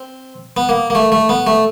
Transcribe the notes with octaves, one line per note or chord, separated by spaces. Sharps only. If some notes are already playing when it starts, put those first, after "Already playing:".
Already playing: C4
B3
A#3
A#3
A3
A3
B3
A3